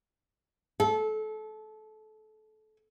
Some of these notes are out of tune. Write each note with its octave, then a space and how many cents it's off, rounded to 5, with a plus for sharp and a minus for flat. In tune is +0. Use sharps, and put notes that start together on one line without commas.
A4 -25